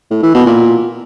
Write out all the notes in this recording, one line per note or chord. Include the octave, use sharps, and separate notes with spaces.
A2
E3
B2
A#2